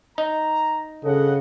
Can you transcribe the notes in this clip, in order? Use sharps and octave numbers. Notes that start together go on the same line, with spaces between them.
D#4 A#5
G2 C#3 A4 D#5 F#5